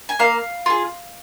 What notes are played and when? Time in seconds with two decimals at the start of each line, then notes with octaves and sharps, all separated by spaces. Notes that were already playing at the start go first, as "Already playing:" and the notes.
0.09 G#5
0.19 A#3 F5
0.66 F4 G#4